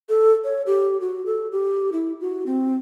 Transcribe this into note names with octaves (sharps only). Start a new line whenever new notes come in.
A4
C#5
G4
F#4
A4
G4
E4
F#4
C4